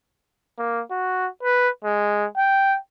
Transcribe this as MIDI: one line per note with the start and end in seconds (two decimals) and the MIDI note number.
0.59 0.82 58
0.91 1.28 66
1.43 1.69 71
1.84 2.26 56
2.37 2.77 79